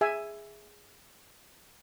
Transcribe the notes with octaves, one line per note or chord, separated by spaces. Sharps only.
G#4 E5 G#5